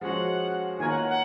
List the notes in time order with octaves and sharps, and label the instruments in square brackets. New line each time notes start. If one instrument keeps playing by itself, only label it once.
[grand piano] F3 G#3 C#4 F#4 C5 [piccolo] F#5
[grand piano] D#3 A#3 F4 A#4 C#5 [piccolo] G#5
[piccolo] F#5
F#5